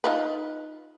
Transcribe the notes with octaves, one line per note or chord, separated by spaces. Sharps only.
D#4 F4 B4